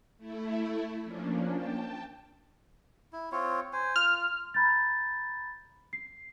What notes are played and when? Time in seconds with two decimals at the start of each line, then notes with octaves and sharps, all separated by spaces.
0.18 A3 E4
1.04 F3 A#3 C#4 D4
1.51 G5 A5
3.13 E4
3.32 C4 F4 C#5
3.73 C5 G#5
3.96 F4 F6
4.54 A#5 B5 G6 A6
5.93 C7